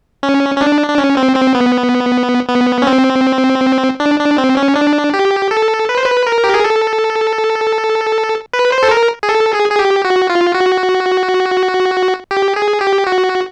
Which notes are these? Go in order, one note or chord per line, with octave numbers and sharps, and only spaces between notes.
C#4
C#4
D4
D4
C#4
C4
C4
B3
B3
C#4
C4
D4
D4
C4
C#4
D4
G4
A4
B4
C5
B4
A#4
G4
G#4
A4
B4
C5
A4
A#4
G#4
A4
G#4
G#4
G4
F#4
F4
F#4
G4
G#4
G4
F#4